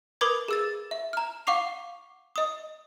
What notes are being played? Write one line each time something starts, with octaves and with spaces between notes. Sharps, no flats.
A#4 B4 B5 D6 D#6 G#6
G#4 E6 A6
E5
A#5 F6
F5 F#5 C#6 D6 C7 F7
D#5 D#6